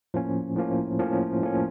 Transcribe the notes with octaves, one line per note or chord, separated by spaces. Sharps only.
A2 F3 A#3 C#4
A2 F3 A#3 C#4
A2 F3 A#3 C#4
A2 F3 A#3 C#4